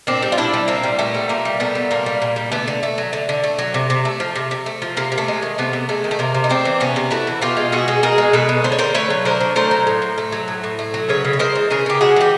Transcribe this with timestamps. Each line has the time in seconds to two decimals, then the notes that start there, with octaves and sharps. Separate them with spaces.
0.07 A#2 C4 D4
0.22 G3
0.32 F4
0.38 A#2 D4 E4
0.54 G3
0.68 A#2 A#3 C4
0.83 G3
0.99 A#2 A3 B3
1.14 G3
1.29 A#2 A#3
1.45 G3
1.60 A#2 A3 B3
1.75 G3
1.91 A#2 A#3
2.06 G3
2.22 A#2
2.36 G3
2.52 D3 A3 B3
2.68 D3
2.83 A3
2.98 F#3
3.13 D3
3.29 D3
3.44 A3
3.59 F#3
3.74 C3
3.90 C3
4.05 A3
4.20 F3
4.36 C3
4.51 C3
4.66 A3
4.82 F3
4.97 C3 A#3
5.12 C3
5.18 A3
5.28 G#3
5.42 D#3
5.58 C3 A3 B3
5.73 C3
5.89 G#3 A3
6.04 D#3
6.11 A3
6.19 C3 A#3
6.34 C3
6.44 D#4
6.49 A3 C4 D4
6.65 E3
6.80 C3 B3 C#4
6.96 C3
7.11 A3 E4 F#4
7.27 E3
7.42 B2 F4 G4
7.57 G#3
7.72 B2 F#4 G#4
7.88 G#3
8.03 B2 G#4 A#4
8.18 G#3
8.33 B2 A4 B4
8.49 G#3
8.64 D3 C5
8.72 C#5
8.79 D3 A#4 C5
8.94 A3 B4 C#5
9.10 F#3
9.25 D3 A#4 C5
9.41 D3
9.56 A3 A#4 C5
9.71 F#3
9.87 A2
10.02 A2
10.18 A3
10.32 F#3
10.48 A2
10.64 A2
10.79 A3
10.94 F#3
11.09 C#3 B4 C#5
11.25 C#3
11.33 C#5
11.39 G#3 A#4 C5
11.55 E3
11.70 C#3 G#4 A#4
11.86 C#3 G4
12.01 G#3 F#4 G#4
12.16 E3 G4